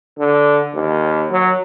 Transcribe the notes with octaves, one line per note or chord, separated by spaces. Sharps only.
D3
D#2
F#3